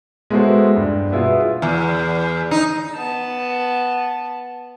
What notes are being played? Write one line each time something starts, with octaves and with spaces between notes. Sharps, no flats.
G#3 B3 E4 F#4 A4 C5
G2
B2 B3 E4 F4 G#4
E2
D#4
B3 A5